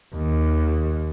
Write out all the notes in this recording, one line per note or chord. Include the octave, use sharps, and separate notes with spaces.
D#2